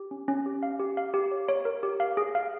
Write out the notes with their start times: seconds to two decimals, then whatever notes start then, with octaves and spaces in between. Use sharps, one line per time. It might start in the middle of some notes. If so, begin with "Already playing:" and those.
Already playing: G4
0.11 C#4
0.28 C#4
0.46 G4
0.63 F5
0.79 G4
0.97 F5
1.14 G4
1.31 C#5
1.48 C#5
1.65 A#4
1.83 G4
2.00 F5
2.17 G#4
2.35 F5